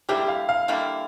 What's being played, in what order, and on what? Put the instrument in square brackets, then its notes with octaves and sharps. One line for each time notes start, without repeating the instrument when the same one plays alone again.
[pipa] D3 G3 A#3 E4 [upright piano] G4
[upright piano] F5
F5
[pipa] D3 G3 A#3 E4